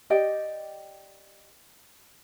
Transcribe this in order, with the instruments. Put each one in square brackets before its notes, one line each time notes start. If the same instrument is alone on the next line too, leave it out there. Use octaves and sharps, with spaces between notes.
[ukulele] G4 D5 D#5 G5